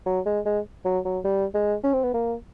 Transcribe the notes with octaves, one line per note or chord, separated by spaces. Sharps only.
F#3
G#3
G#3
F#3
F#3
G3
G#3
C#4
C4
B3
A#3